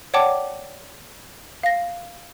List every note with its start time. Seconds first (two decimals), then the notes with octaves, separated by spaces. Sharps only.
0.14 C#5 D5 F#5 G5 A5 D6
1.63 F5 A#6